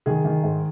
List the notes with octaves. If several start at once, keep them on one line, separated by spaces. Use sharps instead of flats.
D#3 G#4
D#3
G#2